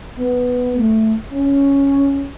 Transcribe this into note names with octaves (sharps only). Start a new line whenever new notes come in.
B3
A3
C#4